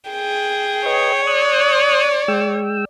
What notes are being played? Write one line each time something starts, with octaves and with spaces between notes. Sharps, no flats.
G#4 G5
B4 C#5 D#5
D5 D#6 F#6
G#3 G5 E6